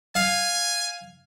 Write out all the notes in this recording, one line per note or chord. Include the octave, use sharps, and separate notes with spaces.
F5 G#5